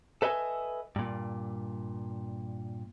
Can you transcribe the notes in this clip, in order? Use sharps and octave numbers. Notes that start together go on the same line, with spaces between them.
A4 B4 D#5 E5 G#5
G2 A#2